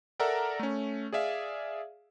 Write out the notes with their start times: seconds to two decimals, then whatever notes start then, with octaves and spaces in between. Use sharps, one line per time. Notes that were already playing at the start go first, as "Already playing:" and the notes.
0.20 A4 A#4 D5 E5 F#5 A#5
0.59 A3 C#4
1.13 G#4 D5 E5 F5